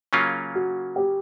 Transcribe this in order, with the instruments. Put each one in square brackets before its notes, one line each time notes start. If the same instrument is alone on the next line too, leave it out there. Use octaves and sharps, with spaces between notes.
[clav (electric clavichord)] C#3 F#3 A#3 C#4 F4
[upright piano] F#4
G4